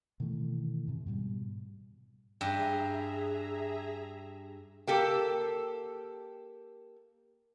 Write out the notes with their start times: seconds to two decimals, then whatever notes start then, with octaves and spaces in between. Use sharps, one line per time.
0.20 B2 D#3 E3 A3
0.87 G#2 C3
1.06 G#2 B2 G3
2.41 G2 G#4 E5 A#5
4.87 A#3 G4 A4